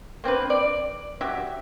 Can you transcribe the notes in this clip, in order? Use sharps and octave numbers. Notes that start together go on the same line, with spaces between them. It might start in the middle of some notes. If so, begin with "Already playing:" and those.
A#3 C4 D4 B4
D5
F#3 G4 E5